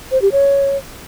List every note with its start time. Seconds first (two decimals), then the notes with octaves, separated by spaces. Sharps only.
0.11 C5
0.22 G4
0.32 C#5